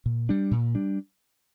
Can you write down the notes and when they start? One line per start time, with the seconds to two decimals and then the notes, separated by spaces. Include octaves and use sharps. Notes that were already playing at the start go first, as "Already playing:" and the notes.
0.06 A#2
0.29 G3 D4
0.51 A#2
0.75 G3 D4